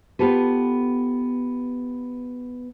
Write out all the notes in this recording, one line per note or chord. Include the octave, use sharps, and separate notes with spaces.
B3 F4 G4 A4 B4